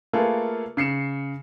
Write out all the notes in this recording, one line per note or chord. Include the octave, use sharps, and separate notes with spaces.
A3 A#3 F4 G#4 A4 B4
C#3 C7 C#7 E7